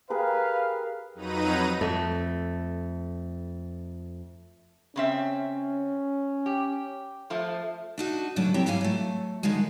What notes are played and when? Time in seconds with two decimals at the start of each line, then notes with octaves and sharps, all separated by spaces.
0.10 G4 G#4 A#4 B4 F5
1.14 F2 F#3 D#4 B4 A#5 D#7
1.81 F2 A3
4.96 C#3 C4 C#4 E5
6.46 G4
7.30 F3 A3
7.98 D4 D#4 F#4
8.36 D2 C#3 F#3 A3 D4 D5
8.54 F#2 F#3 C4 E4 G4 G5
8.66 G#2 F#3 E4 G4 F5 G#5
8.81 F#3 A3
9.43 D3 D#3 F3 F#3 G#3